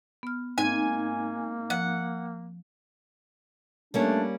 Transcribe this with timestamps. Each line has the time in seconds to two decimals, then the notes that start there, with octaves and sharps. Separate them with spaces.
0.23 B3 F6
0.58 G#2 A#3 C4 G#5
1.70 F3 F#5
3.94 G3 A3 A#3 C#4 D4